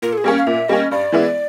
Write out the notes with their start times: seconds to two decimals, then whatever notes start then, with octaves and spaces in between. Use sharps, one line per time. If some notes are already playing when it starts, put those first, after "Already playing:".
0.02 A#2 A#4
0.13 A4
0.18 G#4
0.24 G3 A#3 C#4
0.38 F5
0.47 A#2 E5
0.68 G3 A#3 C#4 D#5
0.91 G2 D5
1.12 E3 G#3 B3 E4